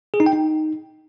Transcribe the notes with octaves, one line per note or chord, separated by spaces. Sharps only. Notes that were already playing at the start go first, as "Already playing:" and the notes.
G#4
D#4
G5
D#4